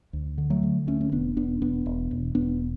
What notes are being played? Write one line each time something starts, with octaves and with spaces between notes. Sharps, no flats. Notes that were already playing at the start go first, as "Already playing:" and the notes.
D2
D3
F#3 A3
D3
D2 A3 C#4
C#4
E1 B3 D4
E1 B3 D4
E1 B3 D4
E1
E1
E1 B3 D4